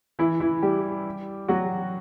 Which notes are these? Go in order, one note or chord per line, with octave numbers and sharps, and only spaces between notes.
E3 E4
E3 E4
G3 G4
F#3 F#4